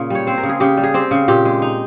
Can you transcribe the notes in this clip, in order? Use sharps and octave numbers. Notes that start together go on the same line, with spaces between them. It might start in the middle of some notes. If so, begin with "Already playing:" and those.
Already playing: A#2 C#3 A#3
G3 C#5
C4 C5
A#4
C#3
G#4
C#3 G4
G3
G#4
C4 G4
C#3
A#2 G4
G#3
D#4